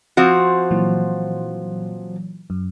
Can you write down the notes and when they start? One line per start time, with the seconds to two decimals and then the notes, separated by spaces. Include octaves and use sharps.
0.17 F3 C4 F#4
0.71 A#2 E3 F#3
2.50 F#2